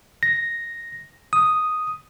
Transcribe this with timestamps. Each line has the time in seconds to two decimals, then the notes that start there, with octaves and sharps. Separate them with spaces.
0.23 A#6
1.33 D#6